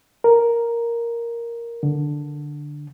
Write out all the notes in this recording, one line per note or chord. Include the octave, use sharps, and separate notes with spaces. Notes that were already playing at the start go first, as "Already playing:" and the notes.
A#4
D3